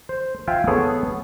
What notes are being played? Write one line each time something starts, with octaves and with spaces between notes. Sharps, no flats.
C5
F4 E5 F5 G5 G#5
B3 G#4 A4 C#5